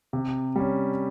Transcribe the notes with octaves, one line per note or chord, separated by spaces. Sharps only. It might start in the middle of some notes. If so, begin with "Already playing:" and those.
C3
G3 C#4